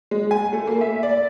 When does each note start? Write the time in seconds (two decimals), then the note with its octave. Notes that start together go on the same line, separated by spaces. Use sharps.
0.11 G#3
0.31 G#5
0.53 A3
0.67 A#3
0.81 E5
1.03 D5